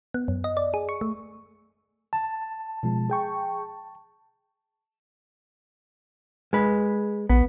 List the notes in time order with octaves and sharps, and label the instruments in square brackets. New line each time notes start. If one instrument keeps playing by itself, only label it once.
[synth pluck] B3
F#2
D#5
D5
G#4
C#6
A3
[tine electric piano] A5
[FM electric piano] B2 F3 G#3
G#4 G5 C#6
[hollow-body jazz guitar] G#3 B4
[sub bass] A#1 [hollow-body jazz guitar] B3